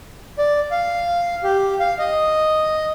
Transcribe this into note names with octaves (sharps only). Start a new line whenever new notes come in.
D5
F5
G4
F5
D#5